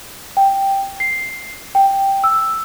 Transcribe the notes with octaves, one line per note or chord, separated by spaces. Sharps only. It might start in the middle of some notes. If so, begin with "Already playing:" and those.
G5
C7
G5
E6